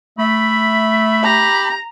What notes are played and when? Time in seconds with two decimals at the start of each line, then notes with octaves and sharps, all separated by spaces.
0.18 A3 E5 B5
1.23 G4 A#5